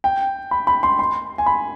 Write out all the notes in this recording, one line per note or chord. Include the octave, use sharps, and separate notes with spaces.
G5
B5
B5
C6
C6
G#5
B5